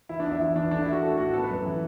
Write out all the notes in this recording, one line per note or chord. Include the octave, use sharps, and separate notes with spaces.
E3 E4
D4
E2 E4
E2 E4
E3 D4
A3 D4
E4
A3 F#4
A3 A4
A2 F#4
B3 A4
B4
F#2
E3